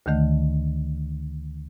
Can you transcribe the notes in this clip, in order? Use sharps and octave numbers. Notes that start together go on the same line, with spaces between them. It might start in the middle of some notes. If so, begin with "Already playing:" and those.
D2 D3 D#3 A3